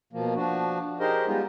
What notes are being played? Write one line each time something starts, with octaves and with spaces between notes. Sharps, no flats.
B2 F3 A#3
F3 D4 F#4
D#4 G4 G#4 A#4 C5 D#5
G3 G#3 B3 D#4 F4 G4